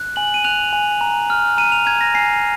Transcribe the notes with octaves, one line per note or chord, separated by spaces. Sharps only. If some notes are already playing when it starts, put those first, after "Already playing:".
Already playing: F#6
G#5 F#7
D#7
F#6 F7
G#5
A#5
F6
A#5 D#7
F7
A#5 G#6
A#6
G#5 C7